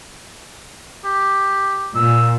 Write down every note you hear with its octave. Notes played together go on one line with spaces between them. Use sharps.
G4
A#2 E6